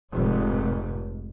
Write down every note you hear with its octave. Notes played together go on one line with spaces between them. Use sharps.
F1 G#2